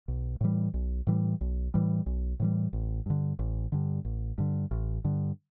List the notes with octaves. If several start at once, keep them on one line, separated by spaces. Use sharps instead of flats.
B1
A2 E3 G3
B1
A2 E3 G3
B1
A2 E3 G3
B1
A2 E3 G3
A1
G2 D3
A1
G2 D3
A1
G2 D3
A1
G2 D3